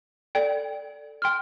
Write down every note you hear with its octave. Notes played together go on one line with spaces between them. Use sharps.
A4 D5 G5
G5 C6 F6